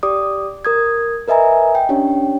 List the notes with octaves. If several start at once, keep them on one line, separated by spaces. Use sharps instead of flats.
G4 D5 D6 D#6
A#4 D#6 G#6
A#4 B4 D#5 E5 G#5 A#5
G5
C#4 D4 G4 C#5 G5